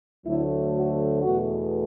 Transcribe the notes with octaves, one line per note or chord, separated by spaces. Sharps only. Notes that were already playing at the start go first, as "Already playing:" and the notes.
D2 D3 F#3 A3 E4
F#4
E2 B2 A3 F#4